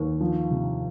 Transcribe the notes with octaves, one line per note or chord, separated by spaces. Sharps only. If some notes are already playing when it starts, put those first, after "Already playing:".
Already playing: D#2
F3
C3